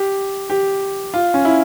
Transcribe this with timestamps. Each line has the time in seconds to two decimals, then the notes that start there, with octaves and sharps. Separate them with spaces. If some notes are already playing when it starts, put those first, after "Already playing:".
Already playing: G4
0.50 G4
1.14 F4
1.34 C#4
1.45 E4